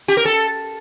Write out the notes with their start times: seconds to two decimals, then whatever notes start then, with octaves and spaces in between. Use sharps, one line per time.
0.08 G4
0.17 A#4
0.25 A4